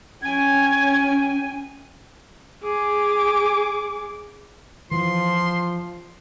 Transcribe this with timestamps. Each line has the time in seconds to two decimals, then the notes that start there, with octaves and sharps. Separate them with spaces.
0.22 C#4 G5 G#5 G#6
2.62 G#4 D6
4.91 E3 F3 C6